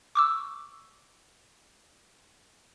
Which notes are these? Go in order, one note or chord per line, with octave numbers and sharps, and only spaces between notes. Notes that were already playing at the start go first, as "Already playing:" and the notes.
C#6 D6 E6